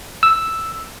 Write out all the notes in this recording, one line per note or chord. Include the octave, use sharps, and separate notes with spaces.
E6